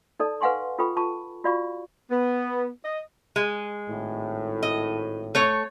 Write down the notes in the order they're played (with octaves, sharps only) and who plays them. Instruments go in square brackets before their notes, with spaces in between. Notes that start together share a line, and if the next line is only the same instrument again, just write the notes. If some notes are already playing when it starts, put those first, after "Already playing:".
[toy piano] D#4 A4 D5 A5
B4 F5 F#5 G#5 C6 C#6
F4 A4 B4 G5 B5 C#6
F4 A5 B5 C#6
F4 F#4 D5 F5 B5 C#6
[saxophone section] B3
D#5
[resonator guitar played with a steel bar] G#3
[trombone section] G#1 A2
[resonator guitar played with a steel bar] D#5
A3 C#5